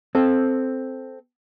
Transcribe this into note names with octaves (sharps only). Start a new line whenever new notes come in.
C4 A4